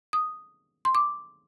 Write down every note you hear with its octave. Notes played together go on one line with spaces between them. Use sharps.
D#6
C6
D6